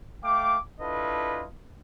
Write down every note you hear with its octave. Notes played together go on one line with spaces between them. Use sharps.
A3 F5 G5 D6
D4 E4 F4 A4 B4 D#5